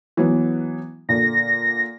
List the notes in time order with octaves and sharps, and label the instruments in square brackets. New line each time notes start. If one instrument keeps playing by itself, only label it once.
[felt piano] E3 F#3 B3
[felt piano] A#2 D3 [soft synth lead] A#6